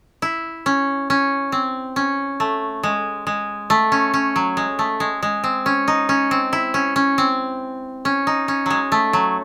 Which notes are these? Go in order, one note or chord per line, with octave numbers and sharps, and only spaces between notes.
E4
C#4
C#4
C4
C#4
A3
G#3
G#3
A3
C#4
C#4
F#3
G#3
A3
G#3
G#3
C4
C#4
D#4
C#4
C4
E4
C#4
C#4
C4
C#4
D#4
C#4
F#3 G#3
A3
F#3